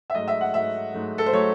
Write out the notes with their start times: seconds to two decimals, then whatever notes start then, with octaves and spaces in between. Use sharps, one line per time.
0.10 E5
0.14 G#2 F#3 A3 D#5
0.28 E5
0.41 F#5
0.54 G#2 F#3 A3 E5
0.94 G#2 F#3 A3
1.18 A4
1.26 C5
1.33 F#3 A3 C#5